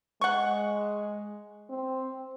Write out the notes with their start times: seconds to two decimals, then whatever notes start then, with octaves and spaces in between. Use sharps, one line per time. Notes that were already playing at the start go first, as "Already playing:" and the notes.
0.21 G#3 F#5 C#6
1.70 C4